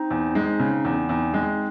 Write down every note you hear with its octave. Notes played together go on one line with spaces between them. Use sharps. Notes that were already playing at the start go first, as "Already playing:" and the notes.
Already playing: C4 D#4
E2
G#3
C#3
E2
E2 C4 D#4
G#3